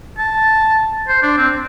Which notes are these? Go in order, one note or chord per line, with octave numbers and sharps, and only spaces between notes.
A5
C5
D4
C4